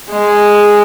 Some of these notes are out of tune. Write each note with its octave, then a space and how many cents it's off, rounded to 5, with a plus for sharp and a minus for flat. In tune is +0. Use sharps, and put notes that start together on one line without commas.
G#3 -5